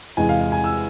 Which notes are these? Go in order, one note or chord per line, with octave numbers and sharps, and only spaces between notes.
E2 C3 G#3 G#5
F5
F5
G#5
E6